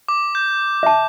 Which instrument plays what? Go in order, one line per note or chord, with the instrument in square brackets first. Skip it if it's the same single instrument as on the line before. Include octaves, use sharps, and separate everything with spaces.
[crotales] D6
G6
[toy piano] E5 A5